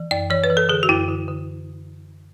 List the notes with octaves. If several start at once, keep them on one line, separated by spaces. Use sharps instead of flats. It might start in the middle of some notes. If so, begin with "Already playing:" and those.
Already playing: E3
F#2 D5
E3 C#5
B4
E3
A4
D3 G#4
F#4
F#2 E4
D3
D3